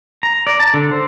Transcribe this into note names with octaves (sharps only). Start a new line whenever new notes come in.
A#5
D5
A5
D3
C5